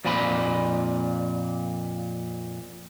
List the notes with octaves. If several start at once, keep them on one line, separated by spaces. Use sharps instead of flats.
F2 A#2 D5 G#5 B5 C6